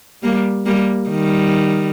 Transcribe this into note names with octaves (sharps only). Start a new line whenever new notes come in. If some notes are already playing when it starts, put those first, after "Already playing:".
G3 A#3
G3 A#3
D#3 G3